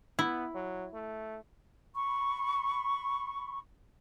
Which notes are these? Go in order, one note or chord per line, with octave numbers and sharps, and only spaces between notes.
B3 E4
F#3
A3
B5 C#6